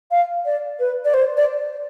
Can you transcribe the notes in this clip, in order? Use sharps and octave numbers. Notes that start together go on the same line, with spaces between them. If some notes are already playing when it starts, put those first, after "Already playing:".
F5
D5
B4
D5
C5
D5